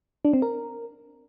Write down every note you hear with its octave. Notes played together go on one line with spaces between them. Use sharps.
D4
C4
A#4